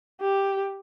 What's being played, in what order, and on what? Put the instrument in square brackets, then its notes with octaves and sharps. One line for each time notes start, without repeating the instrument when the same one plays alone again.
[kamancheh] G4